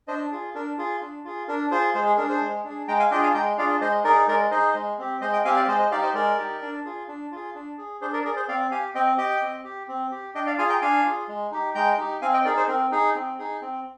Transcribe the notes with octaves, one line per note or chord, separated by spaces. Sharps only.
D4 C5 D#5
F4 G#4
D4 A#4
F4 G#4
D4
F4 G#4
D4 A#4
F4 G#4 C5
G#3 G#4 C5
G#4
D4 G#4 A#4
G#4 C5
G#3
D4 G#4
G#3 G5 A#5
F5 G#5
D4 F4 G#4 D#5 G5
F5 G#5
G#3 G5 A#5
D4 F4 G#4 D5 F5
G#3 C5 D#5
D#4 G#4 A#4 D5
G#3 A#4 D5
D#4 G#4 C5 D#5
G#3
C4 G4
G#3 C5 D#5
D#5 G5
C4 G4 F5 G#5
D5 F5
G#3 C5 D#5
C5 D#5
D#4 G4 D5 F5
C5 D#5
G#3 A#4 D5
D#4 G4
D4
F4 G#4
D4
F4 G#4
D4
G#4
D4 G#4 C5
A#4 D5
G#4 A#4 D5
G#4 C5
C4 D5 F5
G4 F5 G#5
C4 D#5 G5
G4 D#5 G5
C4
G4
C4
G4
D4 D#5 G5
D5 F5
F4 G#4 F5 G#5
G5 A#5
D4 F5 G#5
F4 G#4
G#3
D#4 G4
G#3 G5 A#5
D#4 G4
C4 F5 G#5
D#5 G5
D#4 G#4 A#4 D5
G#4 C5
C4 A#4
D#4 G#4
C4
D#4 G#4
C4